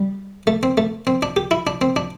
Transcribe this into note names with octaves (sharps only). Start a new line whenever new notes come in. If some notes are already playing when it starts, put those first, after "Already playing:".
Already playing: G3
A3
C4
A3
C4
D4
G4
E4
D4
C4
D4